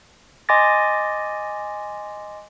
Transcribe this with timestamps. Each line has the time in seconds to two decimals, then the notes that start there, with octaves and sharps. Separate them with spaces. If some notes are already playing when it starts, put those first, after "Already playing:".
0.49 D#5 G#5 C6 D6 A6 A#6